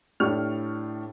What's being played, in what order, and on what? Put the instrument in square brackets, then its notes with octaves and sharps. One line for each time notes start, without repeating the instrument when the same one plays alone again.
[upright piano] A2 D4 G4 C#6 F6 F7